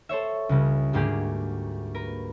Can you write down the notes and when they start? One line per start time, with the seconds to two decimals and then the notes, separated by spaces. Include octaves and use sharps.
0.09 A4 C5 C#5 E5
0.49 C#2 C#3 G3
0.93 D2 G#2 A#3 D4 G4 G#4
1.95 A#4 B4